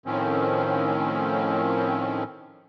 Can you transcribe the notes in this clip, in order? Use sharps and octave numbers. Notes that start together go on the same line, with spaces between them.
A2 D#3 F3 C4 C#4